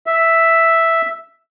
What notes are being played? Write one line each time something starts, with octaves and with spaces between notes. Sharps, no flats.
E5